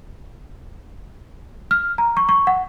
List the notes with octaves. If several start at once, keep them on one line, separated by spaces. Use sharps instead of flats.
F6
A#5
C#6
C#6
F#5